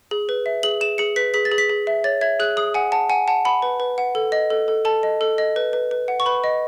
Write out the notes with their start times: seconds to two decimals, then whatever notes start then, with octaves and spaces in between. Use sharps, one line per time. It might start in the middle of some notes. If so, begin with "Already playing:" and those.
0.11 G#4
0.29 B4
0.46 E5
0.63 G#4 F#7
0.81 G#4 E7
0.98 G#4 C#7
1.16 B4 B6
1.34 G#4 B6
1.45 A6
1.52 G#4
1.58 B6
1.69 G#4
1.87 E5
2.04 C#5 A6
2.21 E5 G#6
2.40 G#4 F#6
2.57 G#4 D#6
2.74 F#5 G#5
2.92 F#5 A5
3.10 F#5 G#5
3.28 F#5 A5
3.45 F#5 B5
3.62 B4
3.80 B4
3.98 F#5
4.15 A4
4.32 D#5
4.50 A4
4.68 A4
4.85 A4 A5
5.03 D#5
5.21 A4
5.38 D#5
5.56 B4
5.73 B4
5.91 B4
6.08 F#5
6.20 C#6
6.26 B4 B5
6.44 D#5